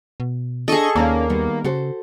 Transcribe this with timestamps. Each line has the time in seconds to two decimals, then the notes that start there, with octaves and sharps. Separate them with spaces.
0.20 B2
0.68 D4 G#4 A4 D#5 C#6
0.96 D#2 A#3 C#4 D#4 D5
1.30 D#3 G3 B3
1.64 C#3 F#4 A4 C5